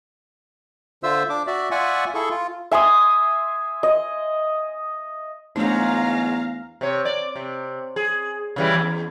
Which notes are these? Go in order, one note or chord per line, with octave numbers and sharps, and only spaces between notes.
D3 F4 C5 E5 E6
D4 D6
F#4 D5 E5
F4 D5 E5 F#5 G#5 C#6
E4 G#4 A4 C#6
F4
E5 G#5 C6 D#6
D#5
E2 G#2 F#3 A3 D4 F5 A#5
C3 C#5
D5
C3
G#4
C#3 E3 G3
E2